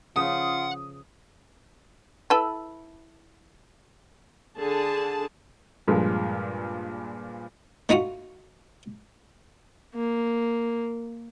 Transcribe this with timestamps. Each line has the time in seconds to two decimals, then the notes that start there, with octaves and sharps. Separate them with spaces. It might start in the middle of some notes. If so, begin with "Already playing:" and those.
0.16 C#3 F3 F4 B4 F#5 D#6
2.30 E4 A4 B4
4.57 D3 G#4 A5
5.88 G2 A#2 F3 G#3
7.89 A3 D#4 F4 F#4
9.95 A#3